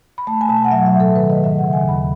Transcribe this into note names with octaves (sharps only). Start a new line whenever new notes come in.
B5
A3 A5
G#5
B2 A5
G#5
F#5
F#3 E5
E5
A2
A4
D#3 B4
D#5
G#2
E5
C#3 F#5
G#5
D#2
B5